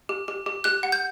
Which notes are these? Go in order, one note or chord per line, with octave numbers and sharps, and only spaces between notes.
G4
G4
G4
G4 F#6
F#5
G6